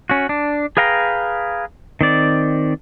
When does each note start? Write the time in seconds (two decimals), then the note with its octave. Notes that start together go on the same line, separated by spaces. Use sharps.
0.10 C#4 F#4
0.29 D4
0.77 G#4 B4 F5 G5 A#5
2.01 D#3 C4 D5